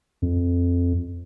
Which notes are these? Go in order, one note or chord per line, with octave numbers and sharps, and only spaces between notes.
F2